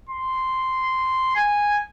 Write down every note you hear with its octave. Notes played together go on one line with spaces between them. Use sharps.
C6
G#5